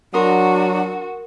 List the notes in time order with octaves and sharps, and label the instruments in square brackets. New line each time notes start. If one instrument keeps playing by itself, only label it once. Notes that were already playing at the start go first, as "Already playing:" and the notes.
[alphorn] F#3 [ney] D4 [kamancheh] F#4 [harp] A#4 C6 D#6